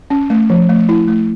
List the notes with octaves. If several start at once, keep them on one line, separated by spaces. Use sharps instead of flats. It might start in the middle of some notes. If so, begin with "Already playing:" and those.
C#4
A3
F3
A3
E4
A3